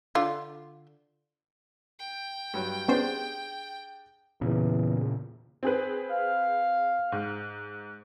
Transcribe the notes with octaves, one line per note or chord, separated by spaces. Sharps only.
D3 F4
G5
G2 F#3
B3 C#4 D4 G4 G#4 C5
E2 A#2 C#3
C4 G#4 B4
F5
G#2